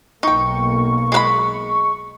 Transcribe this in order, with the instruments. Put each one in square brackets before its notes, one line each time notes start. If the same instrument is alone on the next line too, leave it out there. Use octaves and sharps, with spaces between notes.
[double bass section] B1 A#3 [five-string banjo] D#4 G5 [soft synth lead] C#6
[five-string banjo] G#3 B4 B5